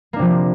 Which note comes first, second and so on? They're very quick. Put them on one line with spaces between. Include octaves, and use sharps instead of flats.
A#3 D4 C3 F3